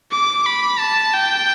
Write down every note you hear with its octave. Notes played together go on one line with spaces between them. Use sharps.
D6
B5
A5
G5